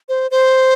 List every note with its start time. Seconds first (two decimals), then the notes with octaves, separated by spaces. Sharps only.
0.09 C5
0.31 C5